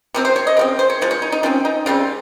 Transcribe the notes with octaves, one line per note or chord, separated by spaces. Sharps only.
C3 F3 C4
C5
C#5
D#5
C#3 F3 C4
C5
C#5
F3 G#3
C#5
D#4
D#4
F3 C4 C#4
D#4
C#3 G3 C4 F4